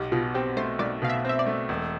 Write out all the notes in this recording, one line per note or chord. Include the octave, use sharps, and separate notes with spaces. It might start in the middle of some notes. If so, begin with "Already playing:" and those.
Already playing: B1 G4
B2 F4
C4 G4
A3 C5
B1 D5
B2 F5
E5
C4 E5
D5
A3
E1